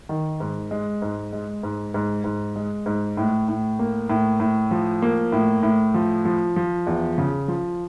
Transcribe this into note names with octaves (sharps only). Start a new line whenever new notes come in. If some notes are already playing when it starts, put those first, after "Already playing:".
D#3
G#2
G#3
G#2
G#3
G#2
G#2
G#2
G#3
G#2
A2
A2
A#3
A2
A2
F3
A#3
A2
A2
F3
F3
F3
E2
C#3
F3